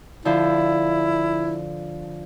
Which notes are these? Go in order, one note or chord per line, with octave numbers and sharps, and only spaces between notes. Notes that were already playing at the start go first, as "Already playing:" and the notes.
D3 F3 E4